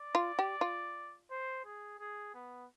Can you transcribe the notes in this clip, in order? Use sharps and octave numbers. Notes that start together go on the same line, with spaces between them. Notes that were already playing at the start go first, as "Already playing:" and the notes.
Already playing: D5
F4
G4
F4
C5
G#4
G#4
B3